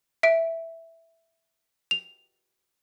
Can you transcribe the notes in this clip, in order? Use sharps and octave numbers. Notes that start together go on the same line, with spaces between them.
E5 D7
F7